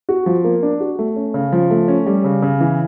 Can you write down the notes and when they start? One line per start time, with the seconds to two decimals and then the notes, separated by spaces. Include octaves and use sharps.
0.09 F#4
0.26 F3
0.44 A#3
0.63 D4
0.80 F#4
0.99 A3
1.16 C#4
1.34 C#3
1.52 F3
1.70 A3
1.88 C#4
2.06 G3
2.24 C#3
2.42 C#3
2.60 E3